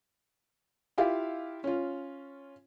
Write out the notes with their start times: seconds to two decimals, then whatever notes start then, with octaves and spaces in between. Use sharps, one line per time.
0.98 E4 F4 G4 F5
1.64 C#4 F4